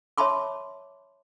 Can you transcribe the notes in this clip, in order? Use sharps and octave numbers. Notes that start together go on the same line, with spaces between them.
C#5 E5 A5 B5 C6 D6